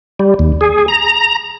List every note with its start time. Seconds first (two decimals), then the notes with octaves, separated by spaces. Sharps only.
0.20 G3
0.39 D#2
0.61 G#4
0.88 A#5